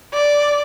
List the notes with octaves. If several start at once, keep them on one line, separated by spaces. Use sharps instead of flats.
D5